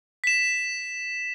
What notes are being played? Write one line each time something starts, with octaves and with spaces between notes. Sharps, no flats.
B6 E7